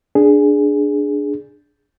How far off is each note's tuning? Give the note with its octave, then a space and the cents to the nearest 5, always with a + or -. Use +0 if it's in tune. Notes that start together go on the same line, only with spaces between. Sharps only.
D4 +0 G#4 +0